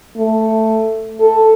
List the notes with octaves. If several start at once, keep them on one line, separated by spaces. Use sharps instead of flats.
A3
A4